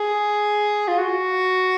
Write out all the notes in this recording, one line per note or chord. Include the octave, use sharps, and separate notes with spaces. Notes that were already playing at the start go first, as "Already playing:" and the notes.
Already playing: G#4
F4
F#4